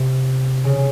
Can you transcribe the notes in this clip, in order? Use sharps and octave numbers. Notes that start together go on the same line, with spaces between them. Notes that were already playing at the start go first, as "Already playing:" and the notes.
Already playing: C3
C#3